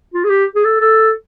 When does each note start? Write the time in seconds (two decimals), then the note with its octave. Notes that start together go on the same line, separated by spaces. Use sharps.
0.14 F4
0.25 G#4
0.30 G4
0.55 G#4
0.64 A4
0.80 A4